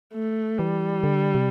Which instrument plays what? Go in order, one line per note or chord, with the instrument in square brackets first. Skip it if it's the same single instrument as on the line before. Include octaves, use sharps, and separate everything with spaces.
[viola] A3
[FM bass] E3 [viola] G3
[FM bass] D3
C3